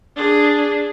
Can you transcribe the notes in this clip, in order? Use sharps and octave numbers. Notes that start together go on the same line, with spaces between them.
D4 G#4